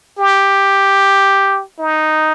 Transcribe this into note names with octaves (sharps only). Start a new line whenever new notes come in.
G4
D#4